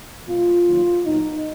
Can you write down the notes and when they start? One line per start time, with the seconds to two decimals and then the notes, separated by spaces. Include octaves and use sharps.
0.28 B2 G#3 B3 F4
0.67 D#3 F#3 A#3
1.06 A#2 F#3 B3 D#4